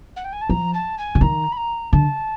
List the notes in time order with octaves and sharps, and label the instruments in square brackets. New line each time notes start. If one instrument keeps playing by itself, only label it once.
[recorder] F#5
G5
G#5
A5
[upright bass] F3 [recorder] A#5
[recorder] A5
G#5
[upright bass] D3
[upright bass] D#3 [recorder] A#5
[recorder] B5
A#5
[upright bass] D3 [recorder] A5